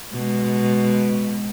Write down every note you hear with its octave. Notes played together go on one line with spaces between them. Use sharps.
B2 G#3